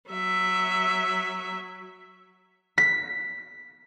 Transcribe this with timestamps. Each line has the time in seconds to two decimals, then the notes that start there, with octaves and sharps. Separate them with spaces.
0.10 F#3 E5
2.78 B6